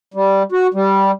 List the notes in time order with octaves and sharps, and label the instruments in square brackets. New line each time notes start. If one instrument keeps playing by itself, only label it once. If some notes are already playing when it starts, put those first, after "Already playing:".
[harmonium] G3
F#4
G3